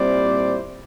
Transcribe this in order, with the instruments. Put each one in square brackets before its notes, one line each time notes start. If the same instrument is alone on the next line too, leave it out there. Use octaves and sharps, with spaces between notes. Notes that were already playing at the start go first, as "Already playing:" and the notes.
Already playing: [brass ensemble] A#2 G3 C4 E4 C5 D5